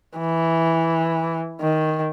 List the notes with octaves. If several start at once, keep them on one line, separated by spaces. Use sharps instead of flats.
E3
D#3